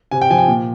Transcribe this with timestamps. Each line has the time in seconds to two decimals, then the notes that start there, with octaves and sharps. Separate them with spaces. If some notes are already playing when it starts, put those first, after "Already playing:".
0.11 C3 G#5
0.22 G5
0.30 F3 G#5
0.38 G5
0.48 A#2